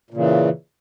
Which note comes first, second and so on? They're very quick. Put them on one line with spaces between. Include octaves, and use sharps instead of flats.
A#2 C#3 E3